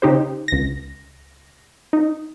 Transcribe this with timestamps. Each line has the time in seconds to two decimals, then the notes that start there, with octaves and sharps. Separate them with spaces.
0.02 C#3 D#4 G4 C5
0.48 C#2 A#6
1.93 D#4